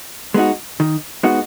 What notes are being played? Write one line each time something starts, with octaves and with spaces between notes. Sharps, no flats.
G#3 B3 D#4 F#4
D#3
G#3 B3 D#4 F#4